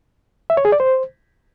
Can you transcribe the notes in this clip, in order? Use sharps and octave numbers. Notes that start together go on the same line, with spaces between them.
E5
C#5
G#4
D5
C5